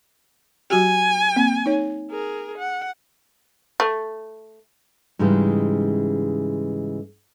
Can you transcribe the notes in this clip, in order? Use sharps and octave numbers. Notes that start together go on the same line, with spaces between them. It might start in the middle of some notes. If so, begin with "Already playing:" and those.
F#3 F#4 G4 G#5
A#3 C4
D#4 C#5
G#4 A#4
F#5
A3
G#2 C#3 E3 G3 G#3